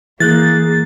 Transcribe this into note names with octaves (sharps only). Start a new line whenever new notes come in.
E3 A#3 G#4 F#6 G6 A6